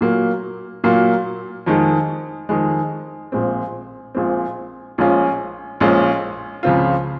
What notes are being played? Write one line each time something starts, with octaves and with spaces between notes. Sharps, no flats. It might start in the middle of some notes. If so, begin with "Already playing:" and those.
A#2 F#3 A#3
A#2 F#3 A#3
F2 D#3 G#3
F2 D#3 G#3
A#1 A#2 G#3 C4
A#1 A#2 G#3 C4
A#1 A#2 G#3 C#4 F4
A#1 A#2 G#3 C#4 F4
C#2 C#3 F3 C4 F4